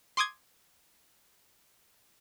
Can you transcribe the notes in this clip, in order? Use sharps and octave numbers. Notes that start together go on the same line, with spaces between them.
C6 D6 D#6 G#6